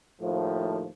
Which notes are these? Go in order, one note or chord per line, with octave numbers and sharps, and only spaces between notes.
D#2 A2 F3